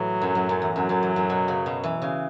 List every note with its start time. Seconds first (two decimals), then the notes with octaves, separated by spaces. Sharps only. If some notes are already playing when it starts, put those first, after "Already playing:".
Already playing: A2 E3 F#3
0.21 F#2
0.35 F#2
0.49 F#2
0.62 E2
0.76 F#2 F#3
0.89 F#2
1.03 E2
1.16 F#2
1.30 B2
1.48 C#3
1.66 B2
1.84 E3
2.02 C#3